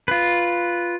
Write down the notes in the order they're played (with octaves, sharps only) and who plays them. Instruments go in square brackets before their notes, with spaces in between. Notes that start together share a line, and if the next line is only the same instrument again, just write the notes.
[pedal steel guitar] F4 B4